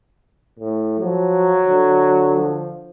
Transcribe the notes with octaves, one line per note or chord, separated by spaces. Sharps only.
A2
F3 F#3
D3
F3